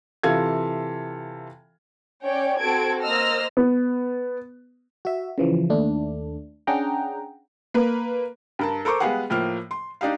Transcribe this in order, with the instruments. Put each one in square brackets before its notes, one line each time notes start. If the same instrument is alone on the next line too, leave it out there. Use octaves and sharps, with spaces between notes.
[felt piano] C3 E3 F4 A4 F5 G#6
[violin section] C#4 C#5 D5 G5
C4 F#4 A4 A5 G#6 D7
A#3 C5 D#5 E6 F6 A#6
[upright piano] B3
[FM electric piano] F#4 E5
C#3 E3 F3
D#2 A3 D4
C#4 D4 G#4 F#5 G5 A#5
[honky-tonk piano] A#3 B4
[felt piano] G2 A#4 A5
A4 A#4 C5 C#6 D6
G3 G#3 B3 G#4 F5 F#5
A2 F3 A#3 F6
C6
D4 D#4 G4 F5